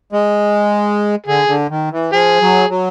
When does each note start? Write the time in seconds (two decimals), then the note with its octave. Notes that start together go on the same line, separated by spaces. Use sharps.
0.12 G#3
1.26 D3 G#4
1.48 D3
1.70 D#3
1.92 E3
2.13 F3 G#4
2.41 F#3
2.70 F#3